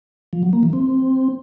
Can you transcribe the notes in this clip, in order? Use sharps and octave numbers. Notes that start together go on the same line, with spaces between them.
F3
F#3
A#3
E3
C4